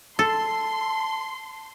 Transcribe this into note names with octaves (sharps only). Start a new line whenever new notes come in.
A4 A5 C6